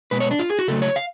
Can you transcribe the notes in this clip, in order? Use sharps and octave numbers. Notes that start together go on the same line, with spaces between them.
B2 G#3 B3 B4
C#5
D4
F4
G#4
F#4
C#3 F#3 A3 A4
C#5
F5